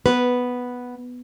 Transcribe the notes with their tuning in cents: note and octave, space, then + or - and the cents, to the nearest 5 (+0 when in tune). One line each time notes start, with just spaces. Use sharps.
B3 +0 B4 +0